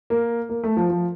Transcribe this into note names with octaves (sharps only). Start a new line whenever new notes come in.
A#3
A#3
A3
F3
F3